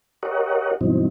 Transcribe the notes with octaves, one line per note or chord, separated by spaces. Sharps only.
G4 A#4 C#5 D#5 F#5
G2 B2 E3 F#3 C4 D#4